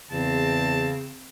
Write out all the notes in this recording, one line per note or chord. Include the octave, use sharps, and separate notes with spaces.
E2 C#3 C4 A5